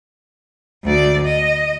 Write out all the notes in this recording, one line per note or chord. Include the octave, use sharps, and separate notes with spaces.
D2 D5
D#5